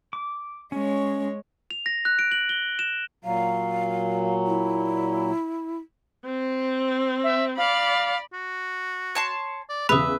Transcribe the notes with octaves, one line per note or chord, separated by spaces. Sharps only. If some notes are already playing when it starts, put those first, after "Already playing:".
D6
G#3 C#4 C#5
F7
A#6
F#6
D7
F#7
G7
E7
A#2 F#3 F5
E4
C4
E5
D5 F5 B5
F#4
C#5 A5 C6
D5
E2 C#3 B4 E5 B5 D#6